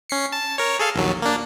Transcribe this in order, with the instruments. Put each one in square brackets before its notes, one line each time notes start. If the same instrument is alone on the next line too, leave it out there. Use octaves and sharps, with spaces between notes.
[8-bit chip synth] C#4 C7 C#7
A5
A#4 C#5
G#4 A4 F5
A#1 D#2 F#3
A#3 D4